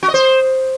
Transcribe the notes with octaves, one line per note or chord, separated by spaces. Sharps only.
F#4
D#5
C5